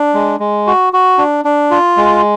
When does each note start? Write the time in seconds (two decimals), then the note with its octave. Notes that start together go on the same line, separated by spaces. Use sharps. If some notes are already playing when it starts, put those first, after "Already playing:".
Already playing: D4
0.14 G#3
0.40 G#3
0.67 F#4
0.93 F#4
1.18 D4
1.45 D4
1.71 F4
1.97 G#3